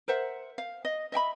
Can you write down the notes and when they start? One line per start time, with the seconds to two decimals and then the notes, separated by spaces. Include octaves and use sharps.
0.08 A#4 C5 E5 F#5
0.58 F5
0.85 D#5
1.12 D#5 E5 G5 B5